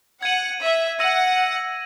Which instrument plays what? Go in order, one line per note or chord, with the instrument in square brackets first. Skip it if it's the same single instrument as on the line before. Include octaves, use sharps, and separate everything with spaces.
[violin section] F#5 [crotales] G#6 D#7 F#7
[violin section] E5
[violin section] F#5 [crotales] E6 A#6 D#7 F#7